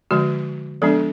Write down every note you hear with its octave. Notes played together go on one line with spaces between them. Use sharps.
D3 F3 G#3 F#4
F3 G#3 B3 D4 A4